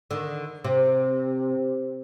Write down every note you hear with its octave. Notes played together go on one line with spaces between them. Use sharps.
D3 D#3
C3